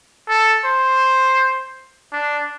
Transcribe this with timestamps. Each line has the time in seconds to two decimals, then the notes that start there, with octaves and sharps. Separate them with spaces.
0.29 A4
0.65 C5
2.13 D4